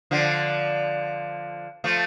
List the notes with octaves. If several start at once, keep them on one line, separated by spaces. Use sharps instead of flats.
D3 F3
F3 A3